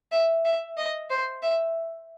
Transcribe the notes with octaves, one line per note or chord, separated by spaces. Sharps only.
E5
E5
D#5
C5
E5